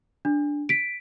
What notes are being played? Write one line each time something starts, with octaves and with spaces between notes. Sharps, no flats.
D4
B6 D7